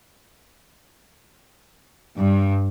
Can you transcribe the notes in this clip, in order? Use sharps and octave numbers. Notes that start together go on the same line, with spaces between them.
G2